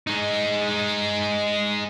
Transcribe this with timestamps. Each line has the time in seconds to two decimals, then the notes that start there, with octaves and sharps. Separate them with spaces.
0.07 G#3 D#4